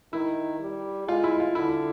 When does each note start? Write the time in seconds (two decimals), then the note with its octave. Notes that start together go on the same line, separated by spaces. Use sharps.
0.13 D#3 E4
0.60 G3
1.08 G#3 F4
1.24 E4
1.40 F4
1.55 D3 E4